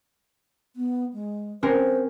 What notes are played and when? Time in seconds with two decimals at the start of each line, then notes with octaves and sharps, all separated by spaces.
0.76 B3
1.13 G#3
1.63 C4 C#4 A#4 C5